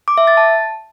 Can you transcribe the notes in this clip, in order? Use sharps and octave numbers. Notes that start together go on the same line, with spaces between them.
D6
E5
A6
A5